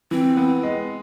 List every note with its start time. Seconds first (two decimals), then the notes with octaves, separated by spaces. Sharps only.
0.11 E3 C4
0.37 B3
0.63 G#3